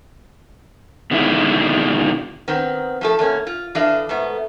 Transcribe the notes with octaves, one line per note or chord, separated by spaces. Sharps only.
B2 D3 D#3 G#3 E4
D#3 B3 C4
F3 A3 A4
E2 A#3 C#4
F4
E3 D4 A4 D#5 F5
G#2 A3 B3